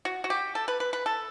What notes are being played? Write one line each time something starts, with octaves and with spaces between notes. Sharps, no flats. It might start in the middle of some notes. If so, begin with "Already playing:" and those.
F#4
F#4
G4
A4
B4
B4
B4
A4